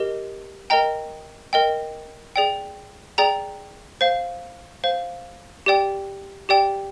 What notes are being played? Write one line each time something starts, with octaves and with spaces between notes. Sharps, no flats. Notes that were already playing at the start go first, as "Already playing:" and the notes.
Already playing: G4 A#4 D#5
A#4 D#5 G5 A#5
A#4 D#5 G5
G#4 D5 G5
G#4 D5 G5 A#5
C5 F5
C5 F5
G4 D5 G5
G4 D5 G5